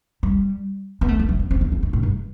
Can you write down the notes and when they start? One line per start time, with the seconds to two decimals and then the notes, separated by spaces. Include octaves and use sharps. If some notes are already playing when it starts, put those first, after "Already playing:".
0.23 G3
1.01 B3
1.08 A3
1.19 A3
1.29 F#3
1.39 B3
1.51 C4
1.61 B3
1.72 B3
1.83 E3
1.93 A2
2.03 G2